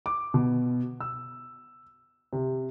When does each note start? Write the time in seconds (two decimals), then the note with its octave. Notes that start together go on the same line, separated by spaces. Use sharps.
0.06 D6
0.34 B2
1.00 E6
2.33 C3